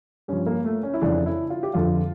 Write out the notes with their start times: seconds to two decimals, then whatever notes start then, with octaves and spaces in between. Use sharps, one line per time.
0.28 G2 F3 C#4
0.46 A#3
0.65 A3
0.83 C#4
0.94 E4
1.01 F2 C#3 E3 D4
1.26 E4
1.50 F4
1.63 G4
1.74 F2 D3 F3 F4